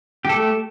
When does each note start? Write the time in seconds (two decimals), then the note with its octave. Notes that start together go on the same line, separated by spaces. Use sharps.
0.25 G4
0.29 A4
0.34 A3